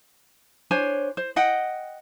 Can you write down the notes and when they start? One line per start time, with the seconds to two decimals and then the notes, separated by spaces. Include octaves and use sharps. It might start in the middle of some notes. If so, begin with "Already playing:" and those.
0.71 D4 C5 C#5 G#5
1.17 C5
1.36 D#5 F#5 G5